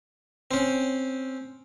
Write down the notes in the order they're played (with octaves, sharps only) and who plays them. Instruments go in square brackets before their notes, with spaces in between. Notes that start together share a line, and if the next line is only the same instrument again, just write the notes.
[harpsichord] C4 C#4